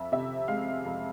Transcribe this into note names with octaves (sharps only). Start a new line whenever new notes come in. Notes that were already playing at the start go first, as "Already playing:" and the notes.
Already playing: F2 E5
C3 E5
G#3 F5
F2